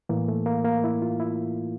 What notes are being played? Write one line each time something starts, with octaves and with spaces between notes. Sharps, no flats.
A2 E3 A#3
A3
A#3
A#3
E4
F4
E4